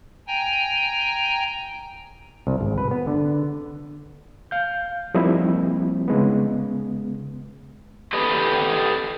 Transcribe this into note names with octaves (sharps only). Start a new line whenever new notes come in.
G5 G#5 A#5
C2
G#1
B4
B3
D3
F5 G6
F3 G3 A#3 C4 D#4 E4
C#3 G#3 B3
G4 A4 B4 D#5